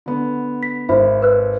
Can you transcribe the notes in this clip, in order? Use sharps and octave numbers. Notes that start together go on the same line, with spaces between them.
D3 B3
B6
G#1 C5 E5 B5
B4 E6 F#6